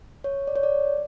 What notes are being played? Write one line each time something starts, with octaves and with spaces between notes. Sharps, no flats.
C#5
D5
C#5
D5